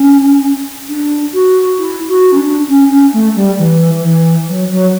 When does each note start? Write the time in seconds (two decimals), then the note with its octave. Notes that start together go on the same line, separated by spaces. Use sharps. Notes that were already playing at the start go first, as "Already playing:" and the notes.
Already playing: C#4
0.88 D4
1.33 F#4
1.78 E4
2.08 F#4
2.32 C#4
2.38 D4
2.68 C#4
2.90 C#4
3.13 A3
3.35 G3
3.58 E3
4.03 E3
4.48 F#3
4.70 F#3